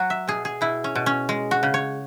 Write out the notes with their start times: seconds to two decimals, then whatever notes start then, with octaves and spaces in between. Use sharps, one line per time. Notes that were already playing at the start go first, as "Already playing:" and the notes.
Already playing: F#3 F#4
0.10 E5
0.27 B2 G#4
0.45 G#4
0.61 B2 E4
0.84 C#4
0.95 B2
1.06 C#4
1.29 G#3
1.51 F#4
1.63 C#3
1.74 C#5